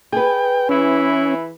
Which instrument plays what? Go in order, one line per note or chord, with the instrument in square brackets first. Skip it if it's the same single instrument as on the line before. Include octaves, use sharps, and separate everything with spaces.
[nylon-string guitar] G#4 B4 [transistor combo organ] G5
[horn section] E3 E4 B5 [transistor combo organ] C#4